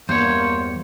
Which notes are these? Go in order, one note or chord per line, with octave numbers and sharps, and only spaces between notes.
E2 G2 A#3 C5 C#5